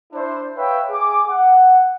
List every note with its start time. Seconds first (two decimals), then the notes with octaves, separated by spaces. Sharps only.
0.13 D4 E4 C5
0.57 B4 C#5 E5 F5 G5
0.90 G#4 D6
1.29 F#5